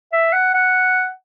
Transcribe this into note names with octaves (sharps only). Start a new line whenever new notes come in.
E5
F#5
F#5